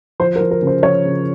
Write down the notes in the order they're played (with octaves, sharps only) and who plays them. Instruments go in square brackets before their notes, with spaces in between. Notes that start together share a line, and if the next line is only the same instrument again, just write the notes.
[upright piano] F3 C5
A#4
F3
A#4
C#3
C5
F3 C#5
C#3